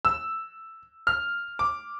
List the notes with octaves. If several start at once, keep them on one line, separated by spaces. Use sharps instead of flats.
E6
F6
D6